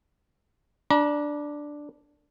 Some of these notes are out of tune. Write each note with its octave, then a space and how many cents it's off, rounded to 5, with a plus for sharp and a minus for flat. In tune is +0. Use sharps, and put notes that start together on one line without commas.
D4 +0 A#5 +45